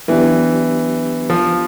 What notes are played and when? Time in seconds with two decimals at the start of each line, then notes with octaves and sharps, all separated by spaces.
0.08 E3 F#3 B3 D4 G4
1.30 F3